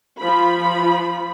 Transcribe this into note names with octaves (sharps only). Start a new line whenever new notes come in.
F3 B5